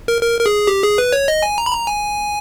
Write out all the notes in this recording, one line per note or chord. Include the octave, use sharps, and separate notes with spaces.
A#4
A#4
A#4
G#4
G4
G#4
B4
C#5
D#5
G#5
A#5
B5
A#5
G#5